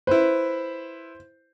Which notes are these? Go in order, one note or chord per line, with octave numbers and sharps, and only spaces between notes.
E4 B4 C5